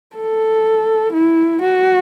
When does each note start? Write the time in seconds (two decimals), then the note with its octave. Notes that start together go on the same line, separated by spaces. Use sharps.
0.17 A4
1.13 E4
1.62 F#4